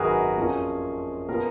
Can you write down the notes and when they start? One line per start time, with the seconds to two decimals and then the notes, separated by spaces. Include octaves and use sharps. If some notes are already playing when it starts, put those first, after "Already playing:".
Already playing: G#1 F#2 D#3 F#4 G#4 A#4 B4
0.36 F2 F3 A#3 C#4
1.29 A#2 F3 B3 A#4